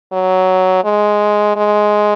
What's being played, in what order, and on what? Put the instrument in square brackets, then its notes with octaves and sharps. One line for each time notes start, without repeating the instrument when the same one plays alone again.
[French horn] F#3
G#3
G#3